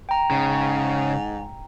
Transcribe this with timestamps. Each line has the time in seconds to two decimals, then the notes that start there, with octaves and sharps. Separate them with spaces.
0.09 G5 A#5
0.31 G#2 C#3